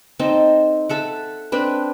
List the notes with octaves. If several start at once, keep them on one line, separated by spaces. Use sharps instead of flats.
C4 D#4 A4
A4 E5 F#5
C4 D4 B4